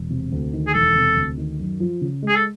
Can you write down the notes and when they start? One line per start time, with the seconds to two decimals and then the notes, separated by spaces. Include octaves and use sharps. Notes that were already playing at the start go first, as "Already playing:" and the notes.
Already playing: E1
0.10 C3
0.32 D2
0.53 D#3
0.67 G#4
0.74 E1 A4
0.95 C3
1.16 D2
1.38 D#3
1.59 F#2
1.80 F3
2.01 C#3
2.22 G#3
2.28 G#4
2.36 A4